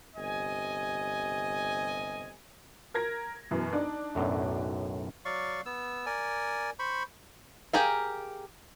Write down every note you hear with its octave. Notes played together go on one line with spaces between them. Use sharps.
G1 C3 D#5 G#5
A#4 G#6 A#6
F#2 B2 E3
D4 D#4
B1 F#2 A2
F#3 D5 F5 C#6
B3 E6
A#4 D5 G#5
C5 B5 C#6
G4 G#4 A#4 F5